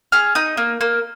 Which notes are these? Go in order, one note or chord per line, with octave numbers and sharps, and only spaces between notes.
G#4 F6
D#4 D#6
A#3
A#3